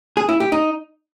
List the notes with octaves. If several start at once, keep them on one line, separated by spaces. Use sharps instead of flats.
G#4
E4
G4
D#4